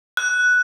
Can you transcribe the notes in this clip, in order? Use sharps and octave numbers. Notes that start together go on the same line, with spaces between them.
F#6